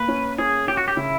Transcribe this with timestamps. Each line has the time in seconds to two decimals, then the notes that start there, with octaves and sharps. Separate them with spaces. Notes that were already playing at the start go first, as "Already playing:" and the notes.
Already playing: A#3 B4
0.08 C#4
0.38 C#4 G#4
0.68 C#4 G4
0.77 F#4
0.88 G4
0.97 C#3 E4